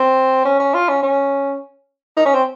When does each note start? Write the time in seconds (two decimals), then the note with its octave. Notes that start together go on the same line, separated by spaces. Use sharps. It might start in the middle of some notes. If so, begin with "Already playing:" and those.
Already playing: C4
0.45 C#4
0.60 C#4
0.74 F4
0.89 C#4
1.03 C#4
2.17 D#4
2.26 C#4
2.34 C4